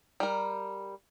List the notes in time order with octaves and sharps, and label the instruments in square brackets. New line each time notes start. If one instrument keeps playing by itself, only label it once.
[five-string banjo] G3 A#4